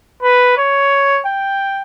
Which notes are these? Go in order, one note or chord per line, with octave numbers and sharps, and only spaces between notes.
B4
C#5
G5